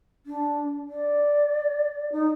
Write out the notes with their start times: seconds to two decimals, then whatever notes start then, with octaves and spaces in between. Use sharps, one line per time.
0.26 D4
0.89 D5
2.12 D#4